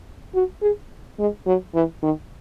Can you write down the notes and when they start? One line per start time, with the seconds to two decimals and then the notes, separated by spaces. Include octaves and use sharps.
0.35 F#4
0.62 G#4
1.19 G#3
1.46 F#3
1.74 E3
2.03 D#3